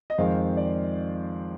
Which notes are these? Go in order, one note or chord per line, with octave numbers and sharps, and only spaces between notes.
D#5
F2 D#3 G#3 C4 F5
D5